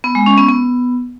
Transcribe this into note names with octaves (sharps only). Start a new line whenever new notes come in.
B3
G#3
C#4
B3
B3